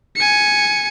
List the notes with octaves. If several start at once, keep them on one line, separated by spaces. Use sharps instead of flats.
G#5 C#7